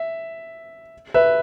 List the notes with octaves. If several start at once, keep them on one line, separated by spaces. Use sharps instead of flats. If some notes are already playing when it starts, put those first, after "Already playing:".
Already playing: E5
B4 E5